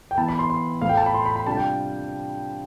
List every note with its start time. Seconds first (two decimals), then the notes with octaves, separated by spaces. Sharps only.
0.11 G5
0.18 E3 B3 E4 A5
0.28 B5
0.39 C6
0.50 C6
0.82 A2 F3 A3 E4 F5
0.89 G5
0.97 A5
1.06 B5
1.14 C6
1.26 B5
1.36 B5
1.47 C3 G3 D4 F4 A5
1.57 G5